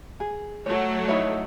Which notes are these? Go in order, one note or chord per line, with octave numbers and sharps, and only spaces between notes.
G#4
F#3 A3 C#5
D#4 E4 C#5